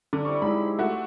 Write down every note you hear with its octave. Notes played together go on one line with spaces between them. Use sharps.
D3 D5 D6
G3 C4 E4 C#6
F#3 G#3 D#4 E4 B5
C4
A3 F#4